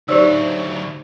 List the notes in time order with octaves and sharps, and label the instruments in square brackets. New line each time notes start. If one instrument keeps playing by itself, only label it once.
[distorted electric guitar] D2 F#3 [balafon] D#4 D5 [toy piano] G4 C5 E6